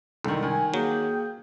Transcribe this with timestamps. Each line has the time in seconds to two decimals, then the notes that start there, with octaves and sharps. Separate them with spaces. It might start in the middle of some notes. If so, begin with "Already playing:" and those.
0.24 C2 D3 D#3
0.43 D#3 G#5
0.74 F#3 A#3 G#4 G5